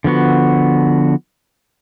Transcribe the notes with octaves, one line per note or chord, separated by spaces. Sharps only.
D3 F3 B3 F#4